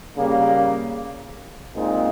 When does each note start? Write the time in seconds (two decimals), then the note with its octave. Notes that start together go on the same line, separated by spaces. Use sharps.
0.17 C#3 G3 A#3
1.76 A#2 G#3 C4 D#4